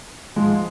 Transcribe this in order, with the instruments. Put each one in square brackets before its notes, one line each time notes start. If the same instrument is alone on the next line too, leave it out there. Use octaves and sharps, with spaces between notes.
[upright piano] G#2 F3 G#3